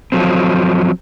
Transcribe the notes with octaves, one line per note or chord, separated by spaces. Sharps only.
F3 F#3 C4